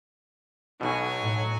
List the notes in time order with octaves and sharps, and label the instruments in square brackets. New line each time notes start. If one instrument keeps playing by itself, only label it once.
[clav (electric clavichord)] B1 B2 [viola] F#3 G#5
[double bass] A2